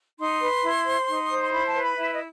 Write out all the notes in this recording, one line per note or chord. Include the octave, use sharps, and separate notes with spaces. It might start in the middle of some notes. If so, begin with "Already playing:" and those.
D#4 C6
B4
E4
C5
D#4
C5 D#6
C6
E4 B5
A5
B4
B5
E4 E5
D#5